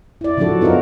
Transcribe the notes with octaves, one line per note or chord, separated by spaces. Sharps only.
E4 D5
C#3 F3 F#3 D4 F#4 A4
B3 D#4 F4 A4 A#4